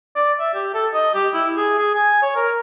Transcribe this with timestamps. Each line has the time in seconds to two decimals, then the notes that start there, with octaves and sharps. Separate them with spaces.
0.16 D5
0.39 E5
0.54 G4
0.74 A4
0.94 D#5
1.14 G4
1.34 E4
1.56 G#4
1.79 G#4
1.94 G#5
2.22 C#5
2.35 A#4